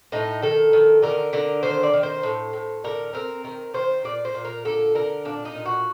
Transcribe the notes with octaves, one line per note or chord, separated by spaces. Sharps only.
A2 D#4
D#3 A4
D#3
D3 A#4
D3 A#4
D#3 C5
D5
D#3
C5
A2
A2
D3 A#4
C4 A#4
D#3 A#4
D#3 C5
A#2 D5
C5
A#2
A#4
D3 A4
D3 A#4
A#2 D4
D#4
A#2
F#4